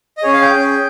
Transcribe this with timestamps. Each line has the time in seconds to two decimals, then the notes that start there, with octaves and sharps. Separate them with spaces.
0.17 D#5
0.23 C#4 G#4 C#5
0.33 F5
0.42 G5
0.52 C#4 G#4